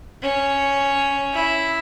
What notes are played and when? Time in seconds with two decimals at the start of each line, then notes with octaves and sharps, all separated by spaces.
0.22 C#4
1.34 E4